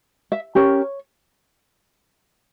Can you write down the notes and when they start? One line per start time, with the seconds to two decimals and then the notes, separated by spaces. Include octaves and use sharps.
0.32 E5
0.55 C#4 G4 A#4 C#5